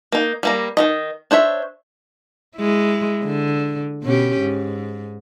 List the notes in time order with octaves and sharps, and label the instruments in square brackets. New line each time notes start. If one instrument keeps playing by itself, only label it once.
[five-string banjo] A#3 D#4
G3 A#3 A#5
D#3 F3 D#5
D4 C5 C#5 E5
[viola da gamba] G#3 E4
D3
B2 C#4 G4
G#2